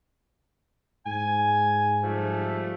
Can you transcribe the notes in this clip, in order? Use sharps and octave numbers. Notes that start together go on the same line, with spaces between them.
G#2 G#5
F3 G3 A3